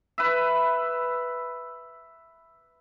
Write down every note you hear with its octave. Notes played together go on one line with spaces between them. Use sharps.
B4 E5